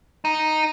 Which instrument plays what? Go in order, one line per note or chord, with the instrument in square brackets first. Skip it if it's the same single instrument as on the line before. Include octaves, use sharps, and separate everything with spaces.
[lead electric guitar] D#4